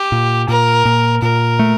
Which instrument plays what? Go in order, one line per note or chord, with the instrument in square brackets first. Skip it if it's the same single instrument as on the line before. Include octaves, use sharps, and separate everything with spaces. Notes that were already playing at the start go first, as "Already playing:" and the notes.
Already playing: [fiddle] G4
[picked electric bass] A#2
[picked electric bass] A#2 [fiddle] A#4
[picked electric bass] A#2
[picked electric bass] A#2 [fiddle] A#4
[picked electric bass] A3